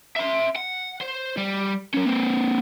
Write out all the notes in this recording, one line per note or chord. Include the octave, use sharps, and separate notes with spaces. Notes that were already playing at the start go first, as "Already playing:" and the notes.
E5 C6
F#5
C5
G3
F#3 C#4
A#3 C4